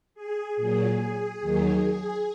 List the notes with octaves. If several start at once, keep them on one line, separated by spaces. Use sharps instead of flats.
G#4
A#2 F#3 G#4
D#2 D#3 F#3